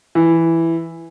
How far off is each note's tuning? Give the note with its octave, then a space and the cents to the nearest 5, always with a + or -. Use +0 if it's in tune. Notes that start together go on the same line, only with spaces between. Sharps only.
E3 +5